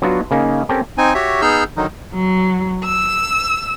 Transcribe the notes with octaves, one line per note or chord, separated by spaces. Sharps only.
F#3 B3 D4 F4 F#4
C#3 A#3 C#4 D#4
C4 C#4 G4 A4 A#4
C4 D#4 G#5
F#4 G4 C#5 E5
B3 D#4 G#4 E6 F6 G6
D3 D#3 F#3 D#4
F#3
E6